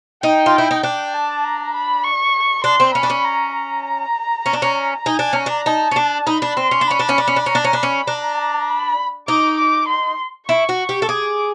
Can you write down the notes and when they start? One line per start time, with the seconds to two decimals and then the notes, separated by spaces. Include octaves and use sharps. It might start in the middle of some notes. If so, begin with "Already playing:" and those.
0.23 D#4 G5
0.46 F4
0.58 E4
0.71 D#4
0.83 D4 G5
1.14 A5
1.44 A#5
1.75 B5
2.04 C#6
2.64 D4 C6
2.80 C4
2.94 C#4 B5
3.03 D4
3.10 C#4
3.24 A#5
3.54 A#5
4.46 C#4
4.53 D4
4.62 C#4
5.06 D#4 G#5
5.19 D4
5.33 C#4 A#5
5.46 D4
5.66 D#4 A5
5.91 C#4
5.96 D4
6.26 D#4 B5
6.42 D4
6.56 C4 C6
6.71 C#4
6.81 D4
6.87 C#4 B5
6.99 D4
7.09 C#4
7.18 D4
7.28 C#4
7.36 D4
7.46 C#4 A#5
7.55 D4
7.64 C#4
7.73 D4 B5
7.83 C#4
8.07 D4 A#5
8.68 B5
9.27 D#4 D6
9.58 D6
9.88 C6
10.48 E4 C#6
10.69 F#4
10.89 G4
11.02 A4
11.08 G#4 D6